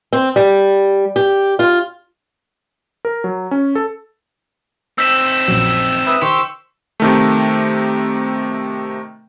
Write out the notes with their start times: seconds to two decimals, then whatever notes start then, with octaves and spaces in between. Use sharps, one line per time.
0.13 C4
0.36 G3
1.16 G4
1.59 F4
3.05 A#4
3.24 F#3
3.51 C#4
3.75 A4
4.98 C4 D#4 E6 B6 E7
5.48 A#1 F#2 F#3
6.07 B4 E5 D#6
6.22 D#3 G4 C5 C#6 E6
7.00 C3 D#3 A3